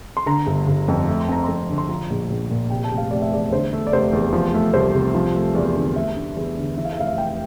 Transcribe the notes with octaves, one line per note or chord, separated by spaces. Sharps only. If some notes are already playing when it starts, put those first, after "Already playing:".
C6
D3 A#5
G1
G1
F2
A3
C6
C4 A#5
F2 C6
D3
C6
F3 A#5
A#1
A#1
A#2
C3 G5
A5
F1
F5
F1 D5
E5
E2 D5
D3 C5
A3
D5
F1 C5
E2
F3
A3
C2 C5
C3
F3
A3
E2 D5
D3
A3 E5
D4
E2
D3
E3 E5
F5
E5
F1 F5
E5
F1 G5